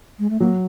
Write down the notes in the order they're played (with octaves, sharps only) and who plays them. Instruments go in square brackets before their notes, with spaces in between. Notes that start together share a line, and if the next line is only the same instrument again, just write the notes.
[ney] G#3
A3
[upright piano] F#3 [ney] A#3